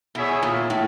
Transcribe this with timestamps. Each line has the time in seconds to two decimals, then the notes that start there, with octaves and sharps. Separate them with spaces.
0.15 B2 E4 G#4 C#5 E5
0.43 A#2
0.70 A2